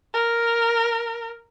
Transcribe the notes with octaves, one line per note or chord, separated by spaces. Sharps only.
A#4